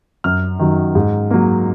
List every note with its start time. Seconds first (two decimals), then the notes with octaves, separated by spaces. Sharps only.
0.24 F#2 F6
0.59 D#3 F#3
0.95 G#2
1.31 F#3 A#3